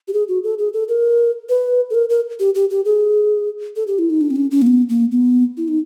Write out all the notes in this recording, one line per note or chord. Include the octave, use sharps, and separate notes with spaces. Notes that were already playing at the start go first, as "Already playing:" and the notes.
G4
G#4
F#4
A4
G#4
A4
A#4
B4
A4
A#4
A#4
G4
G4
G4
G#4
A4
G4
E4
D#4
D4
C4
C#4
C#4
A#3
B3
A#3
B3
E4
D#4